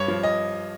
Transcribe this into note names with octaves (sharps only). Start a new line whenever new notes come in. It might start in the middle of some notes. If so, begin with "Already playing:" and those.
Already playing: G2 C#5
F3
D#5